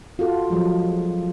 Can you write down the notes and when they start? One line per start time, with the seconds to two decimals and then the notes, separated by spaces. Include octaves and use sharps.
0.19 F4 F#4 A4
0.50 F3 F#3 G#3